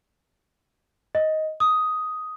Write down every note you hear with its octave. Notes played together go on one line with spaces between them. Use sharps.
D#5
D#6